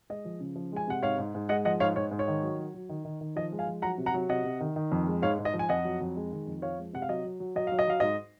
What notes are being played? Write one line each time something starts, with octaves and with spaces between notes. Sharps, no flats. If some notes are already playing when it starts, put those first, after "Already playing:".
G#3 D#5
F3
C#3
F3
G#3 G#5
C3 F#5
G#2 C#5 F5
G#2
G#2
G#3 D#5 F#5
F3 D#5 F#5
G#2 C#5 F5
G#2 C#5
G#2
C#5
D#3
F#3
F#3
F#3
D#3
D#3
D#3
F3 D#5
G#3
F5 G#5
F3
F#3 F#5 A#5
C3
F#5 A#5
F#3
C3 D#5 F#5
C3
D#3
D#3
F2
G#3
G#2 C#5 F5
G#2
D#5
F3
G#5
F2 D#5 F#5
F#3
F2
G#3
D#3
F2
F3 C#5 F5
G#3
C3 F#5
F5
F#3 D#5
F#3
F#3
F#3 D#5
F#3 F5
D#5
F#3 F5
G#2 D#5